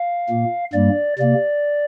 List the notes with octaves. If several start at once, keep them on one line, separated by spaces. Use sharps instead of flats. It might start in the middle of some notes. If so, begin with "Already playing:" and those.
Already playing: F5
A#2 A#3
G2 G3 A#3 D5
C3 A#3 D5